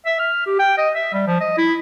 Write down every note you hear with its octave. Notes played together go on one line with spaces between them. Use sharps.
E5
F6
G4
G5
D#5
E5
G3
F3
D#5
E4